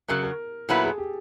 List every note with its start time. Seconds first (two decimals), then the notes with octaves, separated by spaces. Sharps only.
0.08 F#2 C#3 F#3 A#4
0.23 A#4
0.69 A#2 F#3 B3 E4 A4
0.84 G#4
0.98 G4